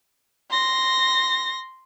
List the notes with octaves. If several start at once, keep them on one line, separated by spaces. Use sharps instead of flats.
C6 A#6